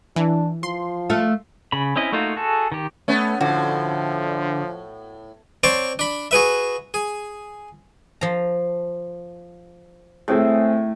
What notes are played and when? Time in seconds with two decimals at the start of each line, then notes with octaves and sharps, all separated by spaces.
0.16 E3 D4
0.63 F3 C6
1.10 A3 F4 A4
1.72 C#3 B5
1.96 C4 C#4 E4 D#5
2.12 A3 A#3 D#4 F4 F#4
2.37 F#4 G#4 A4
2.72 D#3 G4
3.08 A3 B3 C#4
3.41 A2 D3 F3 F#4
5.64 C4 C#5 D5 A5 C6
5.99 D4 B5
6.31 F#4 G#4 B4 E5
6.94 G#4
8.21 F3 A#5
10.28 A2 A3 C4 G#4